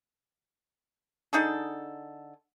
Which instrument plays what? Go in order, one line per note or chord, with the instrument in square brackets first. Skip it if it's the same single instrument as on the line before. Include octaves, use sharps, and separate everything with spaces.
[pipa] D3 D#4 G#4 A4